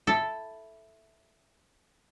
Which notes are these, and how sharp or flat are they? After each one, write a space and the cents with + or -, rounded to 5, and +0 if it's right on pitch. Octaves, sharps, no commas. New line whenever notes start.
E4 +0 A4 +0